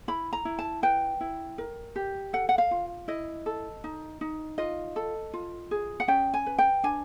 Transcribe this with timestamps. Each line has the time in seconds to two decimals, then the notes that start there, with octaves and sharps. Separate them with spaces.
0.08 E4 B5
0.33 A#5
0.45 E4
0.59 A5
0.83 B4 G5
1.21 E4
1.58 A#4
1.96 G4
2.33 A4 F#5
2.49 F#5
2.58 F5
2.71 F4
3.08 E4 D#5
3.46 A4
3.84 D#4
4.21 D#4
4.58 F4 D#5
4.96 A4
5.34 F4
5.71 G#4
6.00 F#5
6.08 C#4 G5
6.34 G#5
6.46 B4
6.59 G5
6.84 D4 G#5